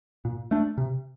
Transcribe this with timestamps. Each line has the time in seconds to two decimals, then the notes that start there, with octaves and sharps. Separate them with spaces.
0.25 A#2
0.51 A3 D4
0.78 C3